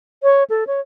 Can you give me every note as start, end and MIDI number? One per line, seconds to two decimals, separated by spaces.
0.23 0.44 73
0.50 0.64 69
0.67 0.80 73